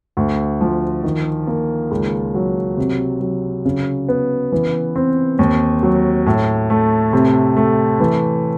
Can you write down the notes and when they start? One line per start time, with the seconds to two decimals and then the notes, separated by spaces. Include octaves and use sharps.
0.17 D2
0.61 F3
1.04 D#3
1.47 A#3
1.91 C#2
2.34 F#3
2.77 C3
3.21 F#3
3.65 C#3
4.09 B3
4.52 E3
4.96 C4
5.39 D#2
5.83 F#3
6.26 A2
6.70 A3
7.13 C3
7.57 A3
8.00 E3